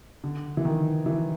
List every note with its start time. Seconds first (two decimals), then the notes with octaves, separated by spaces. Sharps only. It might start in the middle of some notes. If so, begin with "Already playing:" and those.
0.24 D3
0.57 E3
0.65 D#3
1.06 E3